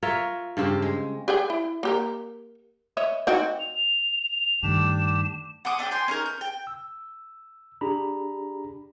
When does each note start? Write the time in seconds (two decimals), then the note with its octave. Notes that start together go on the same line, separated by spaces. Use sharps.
0.03 F4 A#4 C#5 E5
0.57 G2 C#3 C4 G4
0.82 G#3
1.28 G4 G#4 G5
1.50 E4
1.83 A#3 G4 A#4
2.97 C#5 D#5 E5
3.27 C4 D#4 F#4
3.60 F7
4.63 G2 D#3 A3 D4 G4 E7
5.65 F#5 C6 D6 D#6
5.79 D4 E5 G5 D6
5.91 G5 G#5 C6
6.08 C#4 D#4 A#4
6.26 G6
6.41 G5
6.67 E6
7.81 D4 G4 G#4 A#5 B5